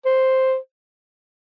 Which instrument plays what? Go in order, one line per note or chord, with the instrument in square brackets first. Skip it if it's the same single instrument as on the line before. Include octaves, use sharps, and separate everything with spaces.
[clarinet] C5